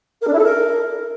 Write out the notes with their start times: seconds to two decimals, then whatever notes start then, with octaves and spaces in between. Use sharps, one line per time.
0.21 A#4
0.27 D4
0.32 E4
0.38 A4
0.44 A#4